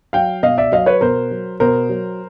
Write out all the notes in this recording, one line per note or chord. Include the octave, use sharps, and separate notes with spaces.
F#3 F5 G5
B2 D#5 F5
D5 E5
F#3 D#5 F5
B4 C#5
B2 A#4 C5
F#3
B2 A#4 C5
F#3